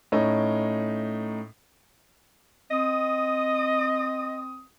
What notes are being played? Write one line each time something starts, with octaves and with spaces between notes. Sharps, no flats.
A2 C#4 D#4
C4 D#5 D#6